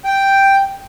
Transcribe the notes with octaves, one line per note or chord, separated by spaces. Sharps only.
G5